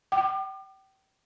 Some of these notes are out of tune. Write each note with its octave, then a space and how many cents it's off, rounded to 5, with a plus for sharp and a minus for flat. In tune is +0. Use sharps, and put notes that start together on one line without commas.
G5 -30 D6 +40